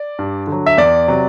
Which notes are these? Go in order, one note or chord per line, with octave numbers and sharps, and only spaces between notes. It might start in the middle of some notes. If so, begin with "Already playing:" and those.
Already playing: D5
G2
D3 F#3
E5
E2 D5
C3 F#3